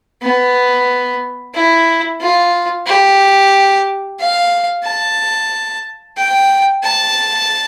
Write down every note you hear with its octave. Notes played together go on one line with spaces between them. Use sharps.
B3
E4
F4
G4
F5
A5
G5
A5